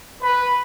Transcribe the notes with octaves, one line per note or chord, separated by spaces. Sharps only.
B4